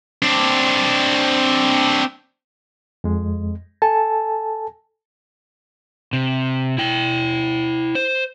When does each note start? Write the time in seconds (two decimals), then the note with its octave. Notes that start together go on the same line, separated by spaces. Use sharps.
0.22 C4 D4
3.04 F2 G#3
3.82 A4 G#5 A5
6.13 C3
6.78 E4 G5
7.95 C5